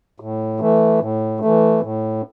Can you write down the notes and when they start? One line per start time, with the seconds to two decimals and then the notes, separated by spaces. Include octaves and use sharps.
0.20 A2
0.60 E3 A3
1.00 A2
1.40 A3
1.45 E3
1.81 A2